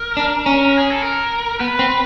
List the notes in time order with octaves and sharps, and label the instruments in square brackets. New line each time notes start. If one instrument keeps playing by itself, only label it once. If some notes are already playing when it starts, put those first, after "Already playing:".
Already playing: [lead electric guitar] A#4
[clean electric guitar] D4
C#4
[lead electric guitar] G#4
A4
A#4
[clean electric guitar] B3 [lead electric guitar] B4
[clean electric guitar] C4